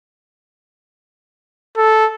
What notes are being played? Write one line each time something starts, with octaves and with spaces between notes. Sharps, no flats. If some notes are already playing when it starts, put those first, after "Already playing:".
A4